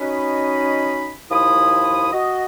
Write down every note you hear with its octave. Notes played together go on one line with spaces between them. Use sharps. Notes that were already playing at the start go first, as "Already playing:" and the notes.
C#4 D#4 F#4 D#5 B5
D#2 F3 E4 B5 D#6
F#4 D#5